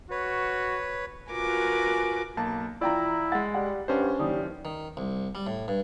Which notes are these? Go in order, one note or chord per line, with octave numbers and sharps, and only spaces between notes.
F#4 B4 C#5
F4 F#4 A#4 B4 G#5 D6
B1 A#3 A5
E3 E4 F4 D5 G5 A#5
G#3 F#5 A6
G3 F#5
G2 C#4 D4 C5
F#1 D#2 G3 D#6
D#3
C2
G3
A2
G2